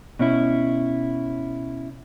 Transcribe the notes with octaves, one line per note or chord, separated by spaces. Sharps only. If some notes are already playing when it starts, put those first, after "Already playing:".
B2 C#4 E4